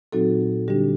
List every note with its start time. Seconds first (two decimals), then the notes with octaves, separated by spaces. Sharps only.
0.12 A#2 F#3 C4 D#4 F#4 A4
0.68 D3 G3 D4 G4